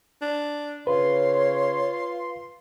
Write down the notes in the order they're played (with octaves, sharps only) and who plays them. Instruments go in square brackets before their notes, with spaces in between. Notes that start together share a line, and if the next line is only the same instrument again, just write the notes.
[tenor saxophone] D4
[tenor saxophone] C#3 [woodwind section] F4 C6 [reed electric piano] B4 [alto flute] C#5